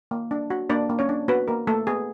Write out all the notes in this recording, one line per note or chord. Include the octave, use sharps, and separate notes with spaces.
A#3
D4
F#4
A#3 D4 D5
A#3
C#4 C#5
D4
B3 F#4 B4
A#3 A#4
A3 A#3 A4
B3 G#4